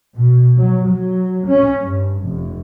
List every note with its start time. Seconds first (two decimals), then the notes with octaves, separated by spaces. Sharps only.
0.16 B2
0.57 F#3
0.87 F#3
1.47 C#4
1.80 G2
2.25 F1